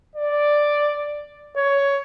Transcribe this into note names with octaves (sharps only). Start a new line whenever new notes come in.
D5
C#5